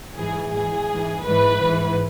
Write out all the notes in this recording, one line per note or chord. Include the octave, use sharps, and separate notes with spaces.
G#2 E3 G#4
G#2 E3 G#4
G#2 E3
G#2 E3 B4
G#2 E3